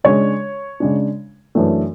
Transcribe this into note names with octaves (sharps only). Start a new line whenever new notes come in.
C#3 G#3 D4 C#5
C#3 G#3 D4
F#2 E3 A3 D4